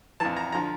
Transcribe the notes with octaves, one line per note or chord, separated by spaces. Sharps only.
F2 E3 A5
A#5
D3 F3 A#5